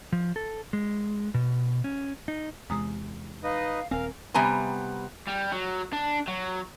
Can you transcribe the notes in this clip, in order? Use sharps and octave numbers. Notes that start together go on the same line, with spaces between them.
F3
A4
G#3
B2
C#4
D#4
E2 C3 G#3 A#5 D#6
D#4 B4 D#5 F5
D#1 C4 A#4 F5 G#5
C3 G3 B3 G#5 A#5
G3
F#3
D4
F#3